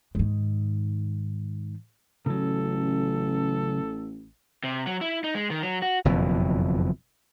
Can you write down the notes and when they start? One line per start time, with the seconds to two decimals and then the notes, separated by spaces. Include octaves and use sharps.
0.15 G#2 D#3
2.26 A1 C#3 F#3 A4
4.64 C3
4.87 F#3
5.01 E4
5.24 D#4
5.35 G#3
5.50 D#3
5.62 F#3
5.82 F#4
6.05 F#1 F2 B2 E3